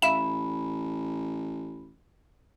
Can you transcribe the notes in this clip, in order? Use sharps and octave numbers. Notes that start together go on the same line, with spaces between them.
A1 E5 F5 B5 E7